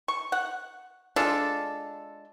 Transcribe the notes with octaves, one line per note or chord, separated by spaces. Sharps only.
C#6
F#5
G#3 D4 F4 A4